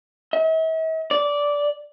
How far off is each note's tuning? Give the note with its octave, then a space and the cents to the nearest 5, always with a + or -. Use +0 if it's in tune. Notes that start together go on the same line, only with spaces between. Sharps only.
E5 -45
D5 -15